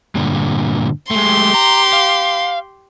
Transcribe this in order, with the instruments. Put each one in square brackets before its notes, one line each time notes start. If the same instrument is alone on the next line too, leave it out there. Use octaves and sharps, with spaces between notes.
[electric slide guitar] G2 A#2 D3
[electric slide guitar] G#3 A3 [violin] G4 C6
[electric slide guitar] A#5
F5